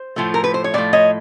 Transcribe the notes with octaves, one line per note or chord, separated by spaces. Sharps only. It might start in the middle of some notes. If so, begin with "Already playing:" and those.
Already playing: C5
A2 F3 A3
A#4
B4
C5
C#5
A2 F3 A3 D5
C#5 D#5